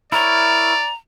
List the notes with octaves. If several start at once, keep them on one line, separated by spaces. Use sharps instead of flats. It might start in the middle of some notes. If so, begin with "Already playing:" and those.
E4 A#4 C#5 D5 A#5